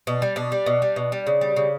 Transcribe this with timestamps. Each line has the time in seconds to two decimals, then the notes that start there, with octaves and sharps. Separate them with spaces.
0.07 B2 D4
0.22 G3
0.36 B2 D4
0.52 G3
0.66 B2
0.82 G3
0.96 B2
1.12 G3
1.26 C#3
1.41 G3
1.56 C#3